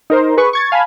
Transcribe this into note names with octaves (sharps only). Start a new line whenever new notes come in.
D#4 A#4 C5
G#4 B4 C#6
C#6 G#6 A6
F5 G#5 A5 B5